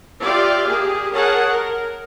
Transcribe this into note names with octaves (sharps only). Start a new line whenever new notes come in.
F4 G4 D5 E5 F5
A#3 G4 G#4
G#4 A#4 C#5 F#5 A5
A#4